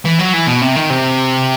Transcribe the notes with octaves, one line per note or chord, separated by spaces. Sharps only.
E3
F#3
E3
B2
C3
D#3
C3